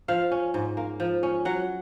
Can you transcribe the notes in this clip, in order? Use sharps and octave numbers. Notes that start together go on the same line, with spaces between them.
F3 F5
C#4
G#2
A#3
F3
C#4
F#3 F#5